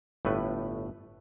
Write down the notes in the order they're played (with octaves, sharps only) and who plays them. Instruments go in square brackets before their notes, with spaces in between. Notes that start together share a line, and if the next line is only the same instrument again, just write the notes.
[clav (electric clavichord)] G1 A2 A3 B4